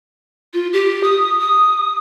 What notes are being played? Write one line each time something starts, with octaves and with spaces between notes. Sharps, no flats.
F4
G4
D#6
D#6